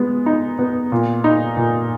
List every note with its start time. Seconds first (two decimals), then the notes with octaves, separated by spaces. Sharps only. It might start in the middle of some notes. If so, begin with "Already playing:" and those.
Already playing: G#3 B3
0.26 D#4
0.59 B3
0.92 A#2
1.24 D#4
1.57 A#2